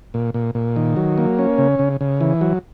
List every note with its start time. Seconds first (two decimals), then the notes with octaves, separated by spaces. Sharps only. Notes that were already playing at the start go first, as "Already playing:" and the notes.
0.14 A#2
0.34 A#2
0.55 A#2
0.76 D#3
0.96 F#3
1.18 A#3
1.39 C#4
1.58 C#3
1.79 C#3
2.01 C#3
2.21 E3
2.41 F#3